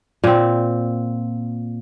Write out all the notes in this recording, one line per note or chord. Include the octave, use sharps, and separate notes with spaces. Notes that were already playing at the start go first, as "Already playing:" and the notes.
A#2 C4